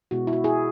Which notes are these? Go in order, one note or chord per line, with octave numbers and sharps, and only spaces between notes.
B2 G#3 B3 E4 F#4
E4
F#4
E4 G#4